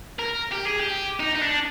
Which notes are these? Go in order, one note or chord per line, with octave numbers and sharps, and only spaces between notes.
A#4
G4
G#4
G4
D#4
D#4
D4